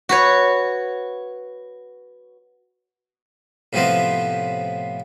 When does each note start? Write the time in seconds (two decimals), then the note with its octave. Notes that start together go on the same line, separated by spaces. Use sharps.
0.09 F#4 B4 C#5
3.73 A2 C3 F3 B3 C4